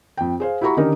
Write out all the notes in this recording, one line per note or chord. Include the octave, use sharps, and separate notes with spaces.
F2 G5
G#4 C5 F5
E4 F#4 G4 A#5 B5 C#6
D3 D#3 C#4 D#4 G4 A#4